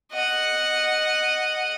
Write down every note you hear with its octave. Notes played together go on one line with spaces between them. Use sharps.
D#5 F#5